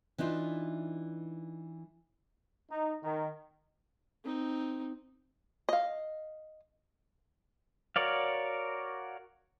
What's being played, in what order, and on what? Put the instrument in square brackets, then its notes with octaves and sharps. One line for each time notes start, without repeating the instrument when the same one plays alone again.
[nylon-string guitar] E3 D4 D#4 F4
[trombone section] D#4
D#3
[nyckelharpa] C4 D#4
[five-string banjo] D#5 F5
[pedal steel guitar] F#4 A#4 C#5 D5 F5